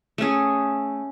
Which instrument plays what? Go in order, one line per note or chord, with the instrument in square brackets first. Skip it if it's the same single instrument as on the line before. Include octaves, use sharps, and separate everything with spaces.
[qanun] A3 C#4 G#4